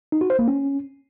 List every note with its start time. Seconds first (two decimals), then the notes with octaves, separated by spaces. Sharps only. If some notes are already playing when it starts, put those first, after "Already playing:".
0.12 D#4
0.21 F#4
0.30 C5
0.39 A#3
0.48 C#4